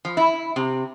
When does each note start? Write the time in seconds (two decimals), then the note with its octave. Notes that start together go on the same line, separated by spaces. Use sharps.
0.05 F3
0.17 E4
0.56 C3